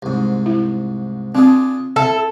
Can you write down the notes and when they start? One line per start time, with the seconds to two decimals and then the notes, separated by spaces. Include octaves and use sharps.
0.02 C2 G#2
0.46 E4
1.35 C4 D4 F4 G#4
1.96 E4 A4